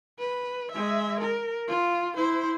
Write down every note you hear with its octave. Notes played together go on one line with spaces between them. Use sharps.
B4
G#3 E5
A#4
F4
E4 C5